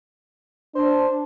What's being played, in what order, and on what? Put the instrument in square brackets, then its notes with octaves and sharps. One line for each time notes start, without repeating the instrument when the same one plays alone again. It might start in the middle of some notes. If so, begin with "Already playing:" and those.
[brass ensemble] D4 [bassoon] C5